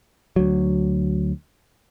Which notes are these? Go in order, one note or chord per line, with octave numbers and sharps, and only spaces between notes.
D2 F#3